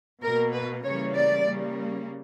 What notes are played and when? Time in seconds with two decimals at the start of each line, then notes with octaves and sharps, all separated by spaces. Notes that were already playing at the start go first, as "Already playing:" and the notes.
0.23 B2 A#3 A#4
0.53 B4
0.84 C#3 E3 G3 A#3 C#5
1.15 D5
1.46 C#3 G3 A#3